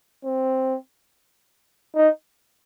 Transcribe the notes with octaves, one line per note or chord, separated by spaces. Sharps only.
C4
D#4